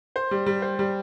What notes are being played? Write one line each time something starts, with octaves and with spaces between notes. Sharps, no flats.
C5
G3
G3
C5
G3